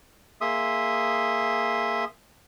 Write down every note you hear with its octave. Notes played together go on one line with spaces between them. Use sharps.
A#3 G#4 E5 C6 D#6